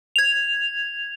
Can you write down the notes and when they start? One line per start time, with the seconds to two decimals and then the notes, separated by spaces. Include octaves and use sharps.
0.16 G#6 F7